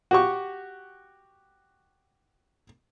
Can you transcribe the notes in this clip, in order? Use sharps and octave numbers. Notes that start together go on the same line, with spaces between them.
F#4 G4 C#6